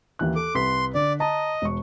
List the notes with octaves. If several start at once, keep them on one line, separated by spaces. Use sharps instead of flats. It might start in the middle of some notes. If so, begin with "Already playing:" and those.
D#2 E3 F#6
A4 D6
C2 B4 C6 B6
D3 D5
D#5 A5 A#5
E1 C#6